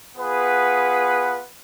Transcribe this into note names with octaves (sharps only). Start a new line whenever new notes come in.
B3 F4 G#4 B4 F#5